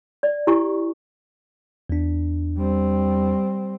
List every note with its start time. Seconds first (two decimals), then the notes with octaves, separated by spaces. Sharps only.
0.23 D5
0.47 E4 G4 G#5 C#6
1.90 E2 D4
2.57 G3 C4